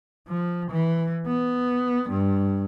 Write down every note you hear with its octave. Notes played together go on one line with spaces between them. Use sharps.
F3
E3
B3
G2